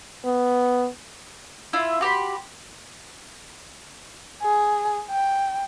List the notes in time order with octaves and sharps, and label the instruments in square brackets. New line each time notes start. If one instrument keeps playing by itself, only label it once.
[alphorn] B3
[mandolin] E4 F4 E5
F#4 G4 B5 C6
[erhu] G#4
G5